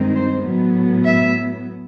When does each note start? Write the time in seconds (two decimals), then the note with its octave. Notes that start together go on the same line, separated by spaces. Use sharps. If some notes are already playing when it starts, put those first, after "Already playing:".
Already playing: G2 D#3 G#3 C4 D#4
0.15 C5
0.46 A2 F#3 B3
1.05 E5